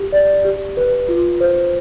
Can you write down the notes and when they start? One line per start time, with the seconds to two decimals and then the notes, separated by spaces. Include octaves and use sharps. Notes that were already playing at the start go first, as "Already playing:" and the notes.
Already playing: G4
0.12 D5
0.45 G4
0.77 B4
1.09 F4
1.41 C5